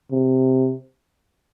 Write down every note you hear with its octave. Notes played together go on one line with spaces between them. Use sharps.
C3